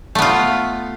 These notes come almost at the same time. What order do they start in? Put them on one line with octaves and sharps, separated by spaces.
A3 B3 F4